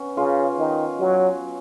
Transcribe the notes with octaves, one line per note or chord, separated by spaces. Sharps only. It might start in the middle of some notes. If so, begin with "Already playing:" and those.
Already playing: B3 C#4
C#3 F4
D#3
F#3